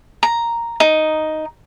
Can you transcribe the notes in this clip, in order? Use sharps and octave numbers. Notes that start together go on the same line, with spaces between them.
A#5
D#4